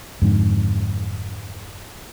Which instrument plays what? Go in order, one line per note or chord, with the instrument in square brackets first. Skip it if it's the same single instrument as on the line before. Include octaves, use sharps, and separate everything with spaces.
[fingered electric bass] F2 G#2 D3